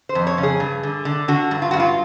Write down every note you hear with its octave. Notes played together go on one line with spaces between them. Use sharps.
C5
F2
C#5
C#3
G#4
G2
D3
D3
D3 F#4
G2
F4
G2 F#4
F4